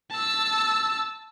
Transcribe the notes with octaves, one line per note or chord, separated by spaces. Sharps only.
A5 E6